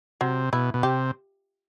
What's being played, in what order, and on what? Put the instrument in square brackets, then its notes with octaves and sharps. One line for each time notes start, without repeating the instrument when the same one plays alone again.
[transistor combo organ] C3 [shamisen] F#3
[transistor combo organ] B2 [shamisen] E4
[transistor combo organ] B2
[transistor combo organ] C3 [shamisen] G4